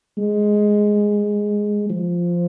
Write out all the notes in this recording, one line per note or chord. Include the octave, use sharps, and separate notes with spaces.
G#3
F3